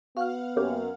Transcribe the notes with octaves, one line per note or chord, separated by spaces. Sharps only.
B3 F#4 F5 F#5 F6
F#2 A#3 C#4 G4